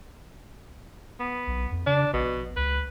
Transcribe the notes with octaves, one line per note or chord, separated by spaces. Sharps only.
B3
B1
F2
C#3 D4
A#1 B2
C#2 B4